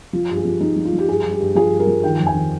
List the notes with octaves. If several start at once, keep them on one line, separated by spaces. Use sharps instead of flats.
F3 F4
G2
G#4
F3
F3 D#4
F3
F4
F3
G4
G2 G#4
G2
G4
G2
F3 G#4
G2
A#4
F3
D#3 G5
F2
G#5
D#3